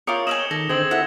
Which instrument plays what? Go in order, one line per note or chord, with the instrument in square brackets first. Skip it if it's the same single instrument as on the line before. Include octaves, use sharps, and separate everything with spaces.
[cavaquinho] F4 A#4 [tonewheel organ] C#5 G5 [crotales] D6 D#6 C#7
[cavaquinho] D#5 E5 G#5 [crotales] E7 F#7
[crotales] G7
[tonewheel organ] D#3 [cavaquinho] A4 [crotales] A#6
[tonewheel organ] D3 G#4 [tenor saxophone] C4 [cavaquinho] D#5 [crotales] G#6 F#7
[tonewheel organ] E4 A4 E5 [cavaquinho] F#5